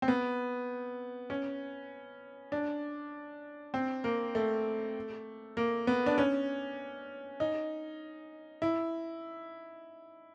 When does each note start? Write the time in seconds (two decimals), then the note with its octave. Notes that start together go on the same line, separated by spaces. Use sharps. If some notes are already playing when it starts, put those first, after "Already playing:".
0.02 C4
0.08 B3
1.30 C#4
2.52 D4
3.74 C4
4.04 A#3
4.35 A3
5.57 A#3
5.87 B3
6.06 D4
6.18 C#4
7.40 D#4
8.62 E4